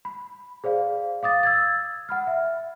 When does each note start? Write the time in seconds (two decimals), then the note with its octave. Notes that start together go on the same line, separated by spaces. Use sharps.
0.05 B5
0.64 G#4 C5 D5 F5
1.23 F5 D6 D#6 A6
1.43 E6 G#6 A6
2.09 F#5 B5 F6
2.27 E5